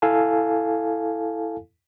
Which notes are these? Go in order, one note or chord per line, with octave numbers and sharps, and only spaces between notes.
E4 A4 F5 G#5 A5